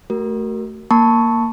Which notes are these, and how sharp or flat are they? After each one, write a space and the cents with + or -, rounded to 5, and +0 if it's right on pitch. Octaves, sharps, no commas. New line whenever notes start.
A3 +0 F#4 +35 A#4 +0
A#3 +0 A5 +5 C#6 +0